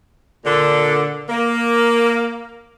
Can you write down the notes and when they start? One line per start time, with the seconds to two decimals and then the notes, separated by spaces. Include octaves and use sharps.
0.44 A#2 D3
1.28 A#3